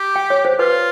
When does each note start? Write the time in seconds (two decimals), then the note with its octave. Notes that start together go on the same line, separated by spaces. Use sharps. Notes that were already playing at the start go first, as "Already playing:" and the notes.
Already playing: G4
0.16 G5
0.30 C#5
0.45 C5
0.59 F4 B4